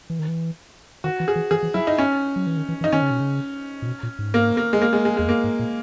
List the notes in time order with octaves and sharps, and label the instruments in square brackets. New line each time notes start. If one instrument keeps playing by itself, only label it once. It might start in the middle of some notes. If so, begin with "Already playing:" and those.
[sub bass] E3
D#3
E3
[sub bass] D#3 [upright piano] F#4
[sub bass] E3
[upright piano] G#4
[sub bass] E3
[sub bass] E3 [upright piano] G#4
[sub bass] E3
[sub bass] F#3 [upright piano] E4
[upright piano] D#4
C#4
[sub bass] F#3
E3
D#3
E3
E3
[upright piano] D#4
[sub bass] D#3 [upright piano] C#4
[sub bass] C#3
B2
C#3
A#2
B2
A#2
G#2
[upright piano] A#3
A#3
G#3
A#3
G#3
G#3
[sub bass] E2 [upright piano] G#3
[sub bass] F#2 [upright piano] A#3
[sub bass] G#2
A#2